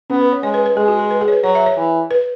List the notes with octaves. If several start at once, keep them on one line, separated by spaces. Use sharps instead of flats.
B3 C#4
B4
C#5
G#3 C#5
B4
B4
G#3 G#4
F#4
G#4
B4
G#4
C#5
B4
F#3 C#5
E5
C#5
E3
B4